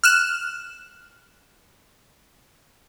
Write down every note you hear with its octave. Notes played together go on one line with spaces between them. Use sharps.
F6 F#6 E7